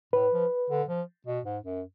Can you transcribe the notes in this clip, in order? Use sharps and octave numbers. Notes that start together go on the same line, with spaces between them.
A2 B4
F3
D3
F3
B2
G#2
F#2